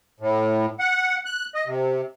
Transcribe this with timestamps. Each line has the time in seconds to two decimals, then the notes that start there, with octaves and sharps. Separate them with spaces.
0.20 A2
0.79 F#5
1.26 F#6
1.55 D#5
1.66 C3